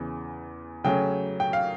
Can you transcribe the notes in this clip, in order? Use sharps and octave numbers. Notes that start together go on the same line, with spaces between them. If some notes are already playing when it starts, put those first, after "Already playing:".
Already playing: E2 C#3 E3
C#3 F#3 A3 C#4 G5
G5
F5